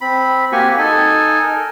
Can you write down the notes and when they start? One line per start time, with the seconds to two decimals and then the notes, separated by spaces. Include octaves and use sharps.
0.01 C4 B5
0.52 A#3 C4 F#4 G4 G#5 C#6
0.78 D#4 A4 G#5
1.43 A#4